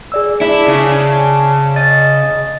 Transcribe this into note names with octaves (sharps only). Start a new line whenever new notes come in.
G#4 D5 E6
D4 E4
C#3
D#5 A6